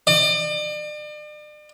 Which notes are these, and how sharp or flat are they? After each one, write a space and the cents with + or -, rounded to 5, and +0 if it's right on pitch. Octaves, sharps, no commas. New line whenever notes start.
D5 +40